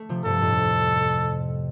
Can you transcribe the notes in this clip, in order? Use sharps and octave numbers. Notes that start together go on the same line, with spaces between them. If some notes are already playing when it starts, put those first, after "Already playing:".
Already playing: A3
C3 F3
G2 C3 A4
F2 A2